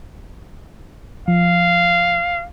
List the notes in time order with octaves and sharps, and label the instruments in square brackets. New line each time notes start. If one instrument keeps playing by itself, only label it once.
[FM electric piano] F3 [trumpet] F5